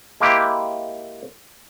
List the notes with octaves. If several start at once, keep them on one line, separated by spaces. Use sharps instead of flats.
G#3 A#3 E4 G4